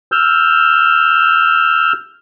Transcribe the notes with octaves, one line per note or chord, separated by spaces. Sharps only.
E6 F6 G6